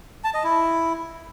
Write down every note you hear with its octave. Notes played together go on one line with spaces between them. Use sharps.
A5
D#5
E4